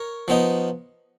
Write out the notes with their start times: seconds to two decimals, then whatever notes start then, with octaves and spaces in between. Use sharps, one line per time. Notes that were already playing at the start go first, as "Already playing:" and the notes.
Already playing: A#4 C#5
0.28 F3 B3 D#4